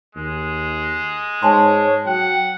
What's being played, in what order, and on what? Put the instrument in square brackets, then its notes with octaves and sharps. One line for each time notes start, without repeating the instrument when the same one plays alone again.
[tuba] D#2 [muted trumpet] G#3
[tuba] G#2 [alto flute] C#5 [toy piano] G#5 A5 C6
[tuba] F#3 [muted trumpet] F#5 [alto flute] G5